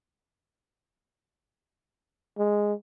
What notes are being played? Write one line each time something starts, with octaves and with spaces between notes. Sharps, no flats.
G#3